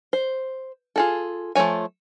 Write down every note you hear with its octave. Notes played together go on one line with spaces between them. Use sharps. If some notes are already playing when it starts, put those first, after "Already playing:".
C5
F4 G#4 A4
F3 A3 A#3 C#5 G#5